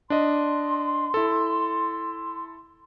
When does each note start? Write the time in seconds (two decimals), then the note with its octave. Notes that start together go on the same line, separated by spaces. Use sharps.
0.10 D4 D#5 C6
1.14 E4 A4